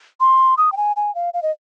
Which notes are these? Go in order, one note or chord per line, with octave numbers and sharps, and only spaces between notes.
C6
D#6
G5
G#5
G#5
F5
F5
D#5